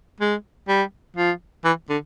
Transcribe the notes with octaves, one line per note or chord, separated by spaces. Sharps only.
G#3
G3
F3
E3
D3